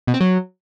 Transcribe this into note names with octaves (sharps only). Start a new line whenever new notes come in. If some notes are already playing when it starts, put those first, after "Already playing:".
B2
C4
F#3